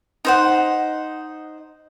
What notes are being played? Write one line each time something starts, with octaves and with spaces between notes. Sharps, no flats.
D#4 C5 F#5